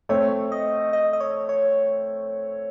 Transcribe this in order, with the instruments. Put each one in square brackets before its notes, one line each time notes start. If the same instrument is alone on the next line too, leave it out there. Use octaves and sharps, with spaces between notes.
[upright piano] A3 C4 [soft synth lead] C#5
[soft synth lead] D#5
D#5
D#5
C#5
C#5